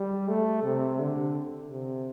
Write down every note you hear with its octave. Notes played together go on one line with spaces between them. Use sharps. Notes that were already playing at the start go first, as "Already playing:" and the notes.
Already playing: G3
A3
C3
D3
C3